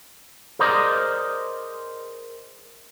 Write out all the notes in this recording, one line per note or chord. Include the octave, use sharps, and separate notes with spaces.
G#4 A#4 C5 D5 D#5